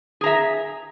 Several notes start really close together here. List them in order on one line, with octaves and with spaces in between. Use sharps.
G#4 A#5 E5